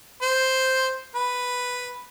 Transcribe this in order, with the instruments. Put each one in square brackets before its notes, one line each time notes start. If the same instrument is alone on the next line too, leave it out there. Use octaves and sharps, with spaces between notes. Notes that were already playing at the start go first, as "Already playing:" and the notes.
[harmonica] C5
B4